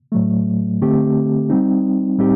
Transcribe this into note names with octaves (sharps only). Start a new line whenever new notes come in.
A2 F#3 A3
D3 A3 C4 G4
G3 C4 D#4
A2 G3 C4 D#4 G4